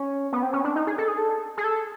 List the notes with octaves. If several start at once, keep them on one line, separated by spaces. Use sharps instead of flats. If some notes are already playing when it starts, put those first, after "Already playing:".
Already playing: C#4
B3
C4
C#4
D4
D#4
G#4
A4
G#4
A4
G#4
A4